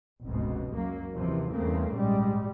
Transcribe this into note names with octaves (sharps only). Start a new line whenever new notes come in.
F1 C#2 G#2 B2
C#2 F#2 F#3 A#3
F#1 D#2 C3 E3 F3
E2 G2 C#3 A3 A#3 C4
A#1 G#2 G3 G#3